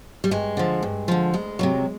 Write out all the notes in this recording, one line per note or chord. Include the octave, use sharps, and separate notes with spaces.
G3
G2 G#3
D3 F3
G2
D3 F3
D2 G#3
C3 D#3 F#3